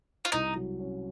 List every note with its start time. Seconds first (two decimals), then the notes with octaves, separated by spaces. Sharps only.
0.25 F4
0.32 C2 D#4
0.56 F#3
0.79 C#4